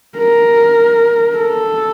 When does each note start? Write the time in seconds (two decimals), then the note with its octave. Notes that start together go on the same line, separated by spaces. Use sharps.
0.18 A#4
1.38 A4